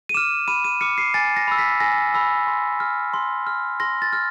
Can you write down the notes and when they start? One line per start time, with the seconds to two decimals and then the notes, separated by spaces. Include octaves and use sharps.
0.09 D#7
0.14 D6 F6 E7
0.48 B5 D#7
0.64 D#7
0.81 D6 F6 C#7
0.98 C7
1.14 G#5 A6
1.36 A#6
1.48 B5 E6
1.58 B6
1.80 G#5 A#6
2.14 B5 E6
2.47 C6
2.80 F6
3.14 C6
3.47 F6
3.80 C6 A#6
4.02 A6
4.13 F6